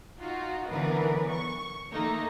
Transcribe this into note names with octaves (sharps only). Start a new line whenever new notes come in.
D#4 F4 F#4
D3 E3 F#3 B3 A#4 B4
C#6
D#3 A3 A#3 D#4